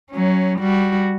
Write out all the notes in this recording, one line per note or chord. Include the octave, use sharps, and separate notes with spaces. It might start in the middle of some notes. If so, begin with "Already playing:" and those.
F#3 C#4
G3 F#4